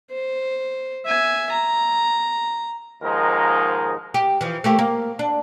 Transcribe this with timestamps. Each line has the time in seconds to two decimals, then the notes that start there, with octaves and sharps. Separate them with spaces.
0.12 C5
1.06 E5 G#5
1.52 A#5
3.02 D#2 G#2 F3 G#3 D#4 A#4
4.14 G4
4.41 E3 F3
4.64 A3 A#3 G4
4.79 A#3
5.19 D4